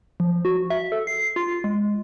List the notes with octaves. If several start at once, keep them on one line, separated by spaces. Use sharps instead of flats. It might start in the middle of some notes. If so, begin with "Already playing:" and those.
F3
F#4
E5
A4
C7
F4
G#3